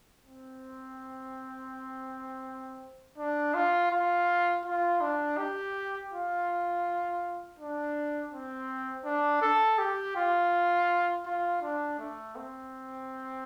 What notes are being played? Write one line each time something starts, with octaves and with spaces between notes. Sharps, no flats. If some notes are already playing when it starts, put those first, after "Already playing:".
C4
D4
F4
F4
F4
D4
G4
F4
D4
C4
D4
A4
G4
F4
F4
D4
A3
C4